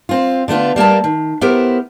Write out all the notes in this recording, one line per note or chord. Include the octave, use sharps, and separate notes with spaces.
C4 F4
D3 A3 B3 F4
G3 A#3 A#4 A5
D#3
B3 E4 G4 A#4 C5